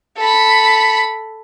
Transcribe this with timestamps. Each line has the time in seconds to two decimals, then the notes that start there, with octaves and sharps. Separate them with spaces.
0.17 A4 B5